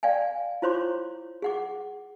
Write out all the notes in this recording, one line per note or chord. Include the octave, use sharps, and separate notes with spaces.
D5 F5 G5 G#5
E4 F4 C5 C#5 C6 D6
G#4 F#5 D6